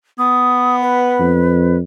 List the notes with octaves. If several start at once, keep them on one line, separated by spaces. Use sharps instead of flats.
B3 D#6
B4
F2